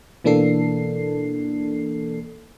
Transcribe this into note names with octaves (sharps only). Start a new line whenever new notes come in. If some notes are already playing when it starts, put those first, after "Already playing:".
B2 E3 A#3 D4 A4 C7